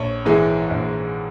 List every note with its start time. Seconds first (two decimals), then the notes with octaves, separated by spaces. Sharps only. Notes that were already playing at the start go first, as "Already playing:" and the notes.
Already playing: A#1 C#5
0.25 G#2 E3 G#3
0.70 A#1